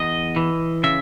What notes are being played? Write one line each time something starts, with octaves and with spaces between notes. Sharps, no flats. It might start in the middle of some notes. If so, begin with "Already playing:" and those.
Already playing: E2 D#5
E3
C#3 E5